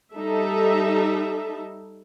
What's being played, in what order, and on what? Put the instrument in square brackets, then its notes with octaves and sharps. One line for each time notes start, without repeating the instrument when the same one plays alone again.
[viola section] G3 D#4 A4 E5